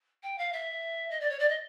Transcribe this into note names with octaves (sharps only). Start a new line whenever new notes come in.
G5
F5
E5
D#5
D5
C#5
D5
D#5